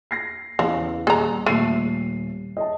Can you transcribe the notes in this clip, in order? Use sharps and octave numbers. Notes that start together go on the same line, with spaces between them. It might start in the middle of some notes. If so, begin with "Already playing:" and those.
A#6 C7
E2 C#3 F5
D#1 G#4 A#5
D#1 A3 C7 D#7
D#5 E5 A5